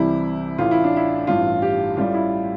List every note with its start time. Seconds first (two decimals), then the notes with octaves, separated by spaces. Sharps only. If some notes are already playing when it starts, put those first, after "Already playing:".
Already playing: C2 C3 E3 G3 E4
0.58 A1 A2 E3 F4
0.71 E4
0.84 D4
0.97 E4
1.27 A1 G2 E3 F4
1.62 G4
1.97 A1 A2 G3 F4
2.14 E4